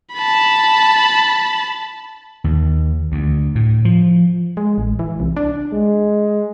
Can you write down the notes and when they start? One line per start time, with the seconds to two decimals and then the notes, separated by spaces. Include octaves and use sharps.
0.14 A5 B5
2.44 D#2
3.12 D2
3.55 A2
3.85 F3
4.57 G#3
4.78 A1
4.99 E3
5.20 C2
5.37 D4
5.73 G#3